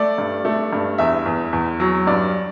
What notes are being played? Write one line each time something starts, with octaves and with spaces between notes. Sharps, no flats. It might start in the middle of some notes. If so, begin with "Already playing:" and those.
Already playing: A3 D5
G2
A3
G2
E2 E5
E2
E2
F#3
G2 D5